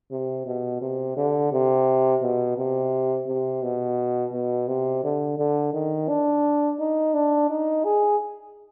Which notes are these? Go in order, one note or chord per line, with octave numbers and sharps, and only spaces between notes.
C3
B2
C3
D3
C3
B2
C3
C3
B2
B2
C3
D3
D3
D#3
D4
D#4
D4
D#4
G#4